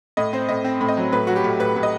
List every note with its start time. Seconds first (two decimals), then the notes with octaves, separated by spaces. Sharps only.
0.17 A2 D#5
0.33 C4 C5
0.49 A2 D#5
0.64 C4
0.81 A2
0.88 D#5
0.97 F#3
1.12 A2 B4
1.27 F#3 F#4
1.36 G4
1.44 A2
1.59 A2 B4
1.76 A2
1.83 D#5